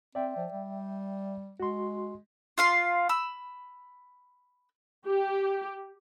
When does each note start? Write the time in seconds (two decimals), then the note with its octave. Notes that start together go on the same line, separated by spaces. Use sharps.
0.15 C4 D5 E5 G5
0.36 F3
0.52 G3
1.60 G#3 F#4 C6
2.58 F4 F5 C6
3.09 B5 E6
5.07 G4